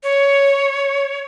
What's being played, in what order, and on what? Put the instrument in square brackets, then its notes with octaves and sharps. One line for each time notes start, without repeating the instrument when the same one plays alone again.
[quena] C#5